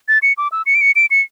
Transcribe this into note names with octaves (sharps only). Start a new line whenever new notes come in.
A6
C#7
D6
E6
C#7
D7
C#7
D7
C#7